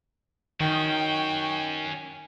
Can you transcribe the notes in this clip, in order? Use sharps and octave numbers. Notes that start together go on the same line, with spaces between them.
D#3 C#4 F#4 G5